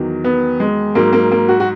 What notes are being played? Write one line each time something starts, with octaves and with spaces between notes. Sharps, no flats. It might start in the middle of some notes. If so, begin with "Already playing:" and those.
Already playing: E2 D#3 F#3
B3
G#3
G#2 F#3 A#3
A#3
A#3
F#4
F#4